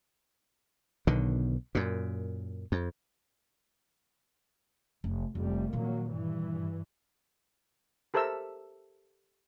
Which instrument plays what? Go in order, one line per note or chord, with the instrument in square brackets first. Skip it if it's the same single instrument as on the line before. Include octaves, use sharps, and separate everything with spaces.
[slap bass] B1 B2 D3 D#3
F#2 A#2
F2
[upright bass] F1
[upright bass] F1 [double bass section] F2 G3
[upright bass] A#2 D#3 [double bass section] F#3 A#3
[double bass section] G2 E3
[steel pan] G4 A4 A#4 C5 E5 E6